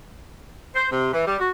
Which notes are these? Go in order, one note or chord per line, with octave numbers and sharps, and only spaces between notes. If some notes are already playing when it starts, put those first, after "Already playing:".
C5
C3
E3
G3
F#4